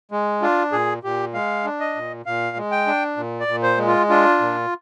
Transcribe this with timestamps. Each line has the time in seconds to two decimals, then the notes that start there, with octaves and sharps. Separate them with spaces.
0.11 G#3
0.42 D4 F4
0.72 A#2 G#4
1.03 A#2 G4
1.34 G#3 F5
1.65 D4
1.80 D#5
1.96 A#2
2.26 A#2 F5
2.57 G#3
2.71 G5
2.87 D4
3.17 A#2
3.40 D5
3.47 A#2
3.63 C5
3.78 G#3
3.87 F4
4.10 D4 F4
4.40 A#2